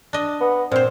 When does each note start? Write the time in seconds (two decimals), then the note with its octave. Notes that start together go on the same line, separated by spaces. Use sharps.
0.13 D4 D#5
0.41 B3
0.72 A#2 C4 C5